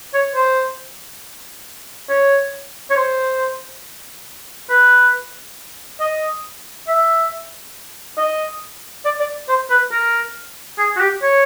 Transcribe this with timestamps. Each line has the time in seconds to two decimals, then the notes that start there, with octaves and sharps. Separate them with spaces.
0.14 C#5
0.35 C5
2.09 C#5
2.91 C#5
2.96 C5
4.70 B4
6.00 D#5
6.88 E5
8.17 D#5
9.05 D5
9.20 D5
9.49 C5
9.70 B4
9.92 A#4
10.78 G#4
10.96 F#4
11.01 G4
11.22 C#5